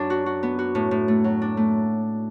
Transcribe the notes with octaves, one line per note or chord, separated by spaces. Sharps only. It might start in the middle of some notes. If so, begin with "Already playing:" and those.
Already playing: F#2 F#3 D4
F#4
F#4
B3
F#4
A2
A2
A3
F#3
D4
A3